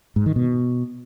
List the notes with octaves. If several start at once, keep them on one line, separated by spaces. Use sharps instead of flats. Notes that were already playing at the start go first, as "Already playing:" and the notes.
G#2
D#3
B2